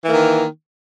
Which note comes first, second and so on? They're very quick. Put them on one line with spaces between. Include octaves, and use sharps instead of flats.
E3 A#3 D#3